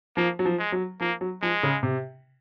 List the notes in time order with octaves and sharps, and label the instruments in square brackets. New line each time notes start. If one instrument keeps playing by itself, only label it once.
[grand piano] F3 [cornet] A#3
[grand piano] F#3
F3
[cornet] G#3
[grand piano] F#3
[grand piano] F3 [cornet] A#3
[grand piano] F#3
[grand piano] F3 [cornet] G#3
[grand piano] C#3
C3